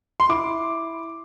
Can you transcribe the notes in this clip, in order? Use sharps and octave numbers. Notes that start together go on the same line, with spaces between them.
C6
E4 D6